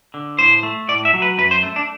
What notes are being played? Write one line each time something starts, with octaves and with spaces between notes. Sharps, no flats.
D3
A2 C5
A3
A2 D5
E5
F#3
B4
F#2 B4
C5
A3
D4